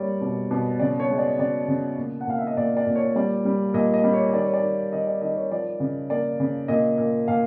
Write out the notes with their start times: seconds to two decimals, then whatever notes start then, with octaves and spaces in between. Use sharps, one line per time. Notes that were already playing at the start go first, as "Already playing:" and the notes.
Already playing: G3 A#3 C#5 D5
0.21 B2
0.51 B2
0.79 C#3 D5
1.00 C#5
1.10 G#3
1.18 D5
1.39 C#3 D5
1.68 C#3
1.97 A#2
2.21 F#5
2.27 A#2 F5
2.38 E5
2.47 D#5
2.57 A#2 D5
2.77 D5
2.87 A#2
2.96 C#5
3.16 G3 D5
3.45 G3
3.74 A#2 D#5
3.94 D#5
4.04 G3
4.13 C#5
4.34 D#3 D5
4.43 C#5
4.54 D5
4.62 D#3
4.92 D#3 D#5
5.07 D5
5.21 D#3 D#5
5.37 C#5
5.51 F3 D5
5.80 C#3
6.10 A#3 D5
6.40 C#3
6.68 A#2 D#5
6.98 A#2
7.28 A#2 F5